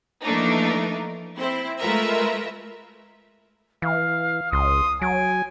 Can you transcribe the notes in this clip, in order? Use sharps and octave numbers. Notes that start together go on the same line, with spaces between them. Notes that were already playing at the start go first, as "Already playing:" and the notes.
E3 F3 A3 A#3 D4 D#4
C4 E4
G#3 A3 F4 A#4 B4 E5
E3 F5
C#2 C6 D#6
F#3 G#5 D7